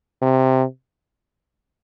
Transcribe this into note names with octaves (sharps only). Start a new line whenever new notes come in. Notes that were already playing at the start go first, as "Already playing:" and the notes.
C3